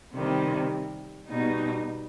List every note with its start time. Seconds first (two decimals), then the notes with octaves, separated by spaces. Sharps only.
0.13 C3 D#3 G3
1.27 B2 G3 D#4